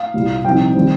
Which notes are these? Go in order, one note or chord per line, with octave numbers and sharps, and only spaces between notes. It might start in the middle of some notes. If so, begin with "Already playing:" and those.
Already playing: F5
C2 A#2 G3
C2 A#2 F3 C4 D#4 G5
D#3 G3 C4